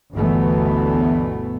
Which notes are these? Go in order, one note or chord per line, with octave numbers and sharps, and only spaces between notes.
G1 D2 B2 E3 A3 B3